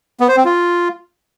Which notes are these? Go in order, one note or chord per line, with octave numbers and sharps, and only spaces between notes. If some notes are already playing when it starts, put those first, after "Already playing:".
B3
C5
C4
F4